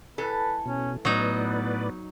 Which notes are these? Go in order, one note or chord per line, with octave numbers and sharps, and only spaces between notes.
E3 A4 B4
B2 C#4
A2 F#3 B3 D#4 B4 D5